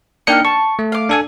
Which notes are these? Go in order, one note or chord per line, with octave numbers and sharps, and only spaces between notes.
A#3 D4 D#4 G5 F6 C#7
A5 C#6
A3
F5 D6
D4 A4 G#5